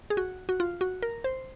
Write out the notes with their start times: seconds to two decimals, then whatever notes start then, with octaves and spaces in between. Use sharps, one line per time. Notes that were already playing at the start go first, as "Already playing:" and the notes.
0.10 G#4
0.17 F#4
0.49 F#4
0.60 F4
0.81 F#4
1.02 A#4
1.24 C5